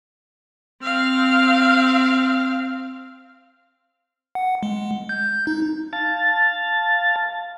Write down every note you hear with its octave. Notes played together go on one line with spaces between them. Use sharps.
C4 F5
F#5
G#3
G6
D#4
F5 A5 A6